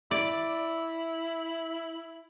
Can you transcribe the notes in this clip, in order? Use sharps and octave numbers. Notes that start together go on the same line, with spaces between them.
E4 D5